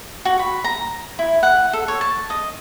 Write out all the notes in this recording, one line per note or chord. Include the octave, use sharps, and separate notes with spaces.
F#4
B5
A#5
E4
F#5
A4
C#5
A5
D#5